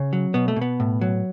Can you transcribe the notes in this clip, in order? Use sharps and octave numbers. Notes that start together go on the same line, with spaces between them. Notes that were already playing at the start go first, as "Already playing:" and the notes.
Already playing: C#3 C#4
F#3
B2 B3
A3
B2
B3
A2
F#3